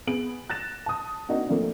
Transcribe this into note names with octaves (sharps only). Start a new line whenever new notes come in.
B3 G#4 D7 F#7
F#6 A6 A#6 E7
A5 D#6
A#3 C4 D4 D#4 F#4
C3 F3 A3 A#3 C4 D4